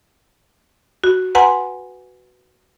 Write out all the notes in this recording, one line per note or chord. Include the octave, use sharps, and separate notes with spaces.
F#4
B4 F#5 G#5 A#5 C6